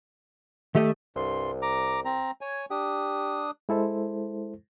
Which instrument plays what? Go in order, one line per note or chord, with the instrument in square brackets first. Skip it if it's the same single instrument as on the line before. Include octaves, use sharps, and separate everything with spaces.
[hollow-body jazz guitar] D#3 G4 D#5 [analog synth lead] A3
[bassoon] C2 [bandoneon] G2 C6
[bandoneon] A#5 D6
C4 A#5
C#5 G#5
[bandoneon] D4 D#6 [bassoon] G4
[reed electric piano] G#3 E4 A4 C5